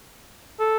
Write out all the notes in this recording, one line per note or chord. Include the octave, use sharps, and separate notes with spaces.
A4